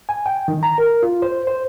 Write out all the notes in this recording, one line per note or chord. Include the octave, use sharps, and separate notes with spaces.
G#5
G5
D#3
A#5
A#4
F4
C5
C5